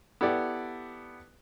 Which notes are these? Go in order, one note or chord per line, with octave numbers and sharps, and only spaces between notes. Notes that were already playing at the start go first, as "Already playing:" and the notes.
B3 E4 G4 A4 D5